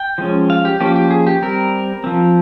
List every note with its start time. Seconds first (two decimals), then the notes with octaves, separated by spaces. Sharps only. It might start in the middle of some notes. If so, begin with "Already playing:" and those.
Already playing: G5
0.18 F3 G#3 C#4
0.50 F5
0.65 G4
0.80 F3 A#3 C#4 G4
0.96 G4
1.11 G#4
1.27 G4
1.42 G3 C4 A#4
2.04 F3 C4